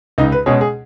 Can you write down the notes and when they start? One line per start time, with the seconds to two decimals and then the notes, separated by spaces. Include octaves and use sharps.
0.18 C#2 D#4
0.32 B4
0.46 B2 G#3 C#4 G#4
0.61 G#4